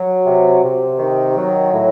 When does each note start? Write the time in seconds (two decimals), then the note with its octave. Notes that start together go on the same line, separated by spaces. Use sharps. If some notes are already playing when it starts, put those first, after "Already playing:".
Already playing: F#3
0.26 C3
0.63 C3
0.99 D#3
1.36 F#3
1.72 A2